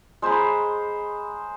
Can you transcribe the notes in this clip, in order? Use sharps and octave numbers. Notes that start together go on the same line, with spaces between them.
G#3 C5 A#5 B5